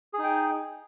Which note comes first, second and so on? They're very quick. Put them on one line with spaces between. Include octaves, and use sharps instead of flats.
G#4 D#4 G5